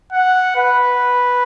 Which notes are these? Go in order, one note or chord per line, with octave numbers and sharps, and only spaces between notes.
F#5
B4